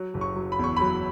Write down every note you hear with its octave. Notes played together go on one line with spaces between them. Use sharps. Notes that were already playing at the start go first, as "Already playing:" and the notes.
Already playing: F#3
F#1
C#6
F#3
B5
E2 C#6
F#3 B5